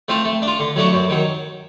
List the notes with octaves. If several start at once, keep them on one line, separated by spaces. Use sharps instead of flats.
A3 C4 F4
A3
D4
F4
D3
F#3 A3 D4 F#4
F#2
D#3 F#3